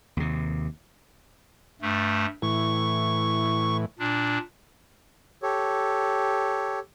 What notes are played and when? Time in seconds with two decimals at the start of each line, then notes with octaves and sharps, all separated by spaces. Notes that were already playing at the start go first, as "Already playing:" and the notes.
0.17 D#2 C3
1.82 G2 A3
2.42 A2 E3 C#6
3.99 A#2 D4
5.43 G4 A4 C#5